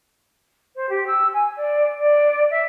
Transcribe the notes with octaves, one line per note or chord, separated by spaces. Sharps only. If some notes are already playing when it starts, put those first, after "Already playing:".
C5
G4
E6
G#5
D5
D5
E5